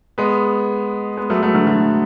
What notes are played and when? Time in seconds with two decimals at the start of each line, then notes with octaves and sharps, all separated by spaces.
0.18 G#3 B3
1.17 G#3 B3
1.30 F#3 A3
1.43 F#3 A3
1.54 D3 F#3
1.67 D3 F#3